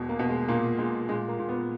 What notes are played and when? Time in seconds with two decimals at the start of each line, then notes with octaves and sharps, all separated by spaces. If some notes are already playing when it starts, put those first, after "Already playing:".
Already playing: E1 B2
0.09 A#3
0.19 B2
0.29 G#3
0.48 A#2 A#3
0.78 A#2 G#3
1.08 A#2 G#3
1.28 A#3
1.39 A#2
1.49 B3